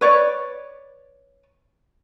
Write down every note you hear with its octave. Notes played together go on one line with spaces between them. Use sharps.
B4 C#5 D5